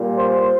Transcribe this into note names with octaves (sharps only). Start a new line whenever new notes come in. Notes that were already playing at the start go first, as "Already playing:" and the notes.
Already playing: A#2 G3
C5